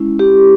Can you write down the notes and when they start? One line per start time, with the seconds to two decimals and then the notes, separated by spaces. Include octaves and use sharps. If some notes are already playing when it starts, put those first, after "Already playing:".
Already playing: G#3 C#4 E4
0.19 G4